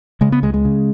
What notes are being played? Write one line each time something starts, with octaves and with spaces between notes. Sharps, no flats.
C#3 G#3
B3
C#2 G#3
G#3
C#3